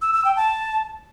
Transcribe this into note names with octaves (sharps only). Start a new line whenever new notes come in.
E6
E6
G5
A5